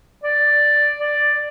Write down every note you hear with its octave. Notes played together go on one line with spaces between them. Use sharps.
D5
D5